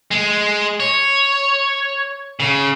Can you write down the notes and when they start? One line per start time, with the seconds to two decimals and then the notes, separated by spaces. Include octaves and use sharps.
0.11 G#3
0.80 C#5
2.40 C#3